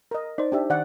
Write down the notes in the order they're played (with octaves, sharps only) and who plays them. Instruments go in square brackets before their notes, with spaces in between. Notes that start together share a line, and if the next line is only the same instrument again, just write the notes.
[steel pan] A#4 D#5
[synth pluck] D#4 C5 [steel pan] D5
[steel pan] D4 G4 E5
[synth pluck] D#3 [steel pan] D5 F#5